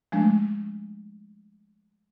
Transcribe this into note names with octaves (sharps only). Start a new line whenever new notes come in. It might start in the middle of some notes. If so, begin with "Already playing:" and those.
F3 G#3 A3 D4